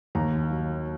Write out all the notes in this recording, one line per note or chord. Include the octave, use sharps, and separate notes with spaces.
D#2 A#5
F#3